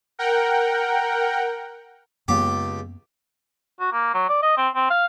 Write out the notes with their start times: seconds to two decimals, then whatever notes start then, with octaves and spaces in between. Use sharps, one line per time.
0.19 A#4 F#5 G5
2.28 C#2 F#2 A#3 B3 G4
3.80 F#4
3.92 A#3
4.14 F#3
4.29 D5
4.43 D#5
4.57 C4
4.75 C4
4.90 F5